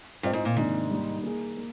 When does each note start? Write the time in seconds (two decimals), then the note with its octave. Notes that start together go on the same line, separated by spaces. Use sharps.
0.23 G2 C4 F4 C5 D#5
0.33 G#2
0.45 A#2
0.56 G#2 C3 D#3 A#3 D4
0.90 G3 A#3 D#4
1.23 A#3 D#4 G#4
1.57 A#3